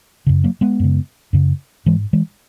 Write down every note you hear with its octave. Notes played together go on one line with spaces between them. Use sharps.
F#2 C#3
F#3 A#3
G#3 B3
F#2 C#3
F#2 C#3
G#2 E3 G#3
E3 G#3